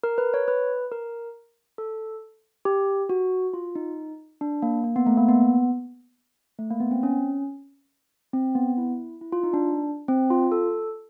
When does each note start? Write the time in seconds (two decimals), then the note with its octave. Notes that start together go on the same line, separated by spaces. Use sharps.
0.04 A#4
0.18 B4
0.34 C#5
0.48 B4
0.92 A#4
1.78 A4
2.65 G4
3.09 F#4
3.54 F4
3.75 D#4
4.41 D4
4.62 A#3
4.84 A#3
4.96 B3
5.06 A3
5.17 A#3
5.29 B3
6.59 A3
6.70 A#3
6.80 B3
6.91 C4
7.03 C#4
8.33 C4
8.55 B3
8.78 E4
9.21 E4
9.32 F4
9.43 D#4
9.53 D4
10.08 C4
10.30 F4
10.52 A4